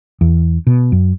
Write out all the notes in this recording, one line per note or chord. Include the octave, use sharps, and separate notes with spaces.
E2
B2
F#2